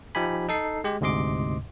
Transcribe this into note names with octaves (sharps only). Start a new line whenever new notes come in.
F3 D#4 G4 G#5 B5
D#4 A4 C7
G#3 G4
D2 G#2 C3 D#5 C6 D6